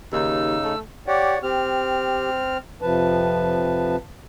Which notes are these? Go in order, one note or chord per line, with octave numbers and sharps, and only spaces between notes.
D#2 C#3 D#4 E6
A3
G4 C#5 D5 F#5
C4 G4 F6
F2 C3 F3 B4 A5